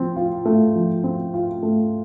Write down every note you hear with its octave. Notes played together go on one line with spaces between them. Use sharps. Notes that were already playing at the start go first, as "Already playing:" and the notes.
Already playing: F3 C4
F4
A3
F3
C4
F4
A3